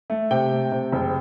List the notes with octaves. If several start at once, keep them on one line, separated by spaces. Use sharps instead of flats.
A3
C3 G5
A3
C3
F#1